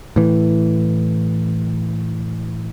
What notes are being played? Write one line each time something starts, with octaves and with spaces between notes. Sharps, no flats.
A2 E3